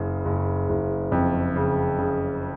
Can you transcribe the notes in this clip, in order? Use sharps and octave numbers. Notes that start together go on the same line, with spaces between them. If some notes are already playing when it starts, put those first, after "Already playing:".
Already playing: F#1 C#3
F#1
F#1
F2
C#3
C#3